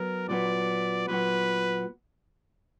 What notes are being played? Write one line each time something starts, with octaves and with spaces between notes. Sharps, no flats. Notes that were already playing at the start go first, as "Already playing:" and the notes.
Already playing: F#3 B3 A#4
A#2 F#3 B3 D5
A#2 F#3 B3 B4